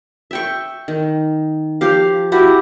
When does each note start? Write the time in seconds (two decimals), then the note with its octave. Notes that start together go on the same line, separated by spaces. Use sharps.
0.31 E5 G5 C#6
0.88 D#3
1.81 F3 G4 F5
2.32 E4 F#4 G4